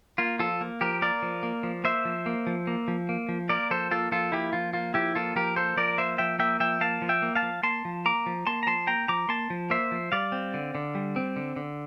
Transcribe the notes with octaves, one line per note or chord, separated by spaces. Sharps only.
A#3 F4
F3 F4 A4
A#3
F3 G4 A#4
A#3 A#4 D5
F3
A#3
F3
A#3 C5 E5
F3
A#3
F3
A#3
F3
A#3
F3
A#3 A#4 D5
F3 A4 C5
A#3 F4 A4
F3 F4 A4
A#3 E4 G4
F3 F4
A#3 F4
F3 E4 G4
A#3 F4 A4
F3 G4 A#4
A#3 A4 C5
F3 A#4 D5
A#3 C5 E5
F3 E5 G5
A#3 E5 G5
F3 E5 G5
A#3 F5 A5
F3
E5 G5
A#3
F5 A5
F3
A#3 A5 C6
F3
A#3 A#5 D6
F3
A#3 A5 C6
A#5
F3 A5 C6
A#3 G5 A#5
F3 A#5 D6
A#3 A5 C6
F3
A#3 C5 E5
F3
G3 D5 F5
C4
D3
D3
G3
C4
D3
D3